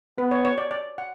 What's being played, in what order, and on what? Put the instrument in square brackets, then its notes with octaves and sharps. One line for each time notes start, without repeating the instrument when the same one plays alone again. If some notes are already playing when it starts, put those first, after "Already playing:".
[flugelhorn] B3 [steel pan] B4
[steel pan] C#5
C#5
D5
D5
F#5